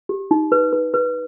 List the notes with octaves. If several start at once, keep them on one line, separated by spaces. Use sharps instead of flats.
G4
D#4
B4
B4
B4